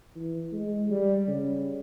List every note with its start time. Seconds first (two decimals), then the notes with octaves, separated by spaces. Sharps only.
0.15 E3
0.52 G#3
0.90 G3
1.28 C#3